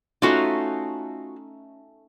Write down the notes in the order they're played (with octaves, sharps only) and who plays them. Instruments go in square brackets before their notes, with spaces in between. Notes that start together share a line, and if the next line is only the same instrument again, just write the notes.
[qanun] A3 C#4 D#4 [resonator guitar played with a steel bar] F4 F#4